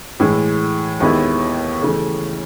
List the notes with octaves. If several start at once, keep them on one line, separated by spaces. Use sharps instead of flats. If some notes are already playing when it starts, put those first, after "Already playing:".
A2 E3 G#3
D#2 D#3 G#3 B3 E4
C#3 E3 A3